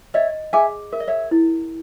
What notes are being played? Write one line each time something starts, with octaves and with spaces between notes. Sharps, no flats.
C#5 D#5 E5
G#4 E5 G#5
A#4 E5
D#5
C#5 E5
E4